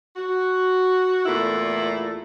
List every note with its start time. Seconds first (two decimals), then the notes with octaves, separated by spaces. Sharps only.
0.17 F#4
1.26 E2 A#2 A3 E4